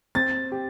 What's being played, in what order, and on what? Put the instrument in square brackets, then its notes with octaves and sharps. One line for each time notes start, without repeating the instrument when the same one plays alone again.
[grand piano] C4 [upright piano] A6
[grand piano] G4